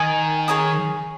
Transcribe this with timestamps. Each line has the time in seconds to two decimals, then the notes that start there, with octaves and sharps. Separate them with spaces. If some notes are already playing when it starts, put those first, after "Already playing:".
Already playing: D#3 A#4 D#5 G#5 D#6
0.48 G#4 C#5 A#5 D#6